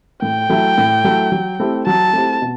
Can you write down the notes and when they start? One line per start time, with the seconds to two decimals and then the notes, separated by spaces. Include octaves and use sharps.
0.22 A2 G5
0.50 F#3 A3 E4
0.78 A2
1.04 F#3 A3 E4
1.32 F#3
1.60 A3 C4 E4 G4
1.87 F#3 A5
2.13 A3 C4 E4 G4
2.42 B2